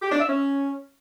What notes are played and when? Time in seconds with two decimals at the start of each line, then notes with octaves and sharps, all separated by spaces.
0.02 G4
0.11 D4
0.20 E5
0.29 C#4